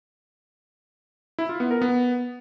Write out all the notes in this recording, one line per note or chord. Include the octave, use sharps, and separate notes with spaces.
E4
F4
B3
A#4
B3